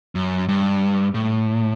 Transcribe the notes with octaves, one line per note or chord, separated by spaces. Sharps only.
F#2
G2
A2